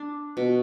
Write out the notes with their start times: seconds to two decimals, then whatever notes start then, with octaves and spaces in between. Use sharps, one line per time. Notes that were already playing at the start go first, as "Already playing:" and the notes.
Already playing: D4
0.37 B2